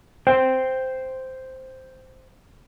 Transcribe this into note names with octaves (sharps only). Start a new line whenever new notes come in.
C5 G5